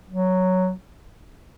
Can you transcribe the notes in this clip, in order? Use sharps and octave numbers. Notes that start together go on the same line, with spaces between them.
F#3